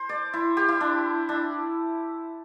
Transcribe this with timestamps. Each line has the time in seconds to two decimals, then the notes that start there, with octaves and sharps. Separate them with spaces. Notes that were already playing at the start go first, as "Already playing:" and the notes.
Already playing: C5
0.09 D5
0.33 E4
0.57 G4
0.68 E4
0.81 D4
1.29 D4